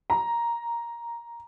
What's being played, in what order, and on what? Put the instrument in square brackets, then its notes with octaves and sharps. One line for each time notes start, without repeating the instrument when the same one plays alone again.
[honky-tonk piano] A#5